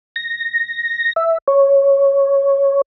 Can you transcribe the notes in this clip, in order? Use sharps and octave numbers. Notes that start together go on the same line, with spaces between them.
A#6
E5
C#5